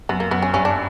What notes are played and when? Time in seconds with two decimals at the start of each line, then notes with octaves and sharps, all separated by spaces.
0.09 F#2 B3
0.20 A#3
0.31 F#2 B3
0.42 C#4
0.54 G2 C#4
0.65 D4